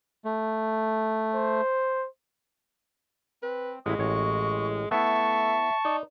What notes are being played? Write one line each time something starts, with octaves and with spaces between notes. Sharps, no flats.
A3
C5
C4 B4
A1 G#3 E4 F#4 D#6
A1 C#5 C#6
A3 B3 E4 E5 A5 C#6
D#4 D5